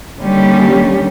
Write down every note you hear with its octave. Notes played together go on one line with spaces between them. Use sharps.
D#2 D3 G3 C#4 G4